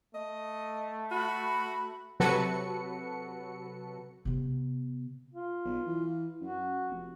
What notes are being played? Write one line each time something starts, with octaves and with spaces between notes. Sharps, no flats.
A3 D#5
F#4 B5
C3 F#3 F#4 A4 B4 C#7
C3 B3
F4
B1
E3
F#2 F#4
F1